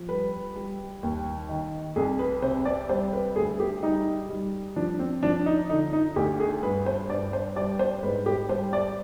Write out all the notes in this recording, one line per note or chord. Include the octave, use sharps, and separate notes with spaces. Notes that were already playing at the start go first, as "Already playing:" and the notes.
Already playing: F3
G3 B4
G3
D#2
D#3
C2 G#4
B4
C3 C5
D5
G3 C5
B4
D2 G#4
G4
G3 D#4
G3
F3 D4
C4
F3 D4
D#4
D3 D#4
D#4
D2 G4
G#4
G2 B4
C5
G2 D5
C5
G3 D5
C5
G#2 B4
G4
G3 C5
D5